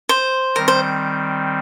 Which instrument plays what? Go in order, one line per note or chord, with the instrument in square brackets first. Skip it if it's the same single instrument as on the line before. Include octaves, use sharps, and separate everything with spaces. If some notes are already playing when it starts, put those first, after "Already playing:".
[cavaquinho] C5
[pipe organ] D#3 G3 C4 [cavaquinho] A#4
[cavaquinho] C5